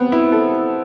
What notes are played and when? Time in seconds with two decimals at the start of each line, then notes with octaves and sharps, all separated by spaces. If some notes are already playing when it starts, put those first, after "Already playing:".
Already playing: B3 C4
0.12 E4
0.32 A4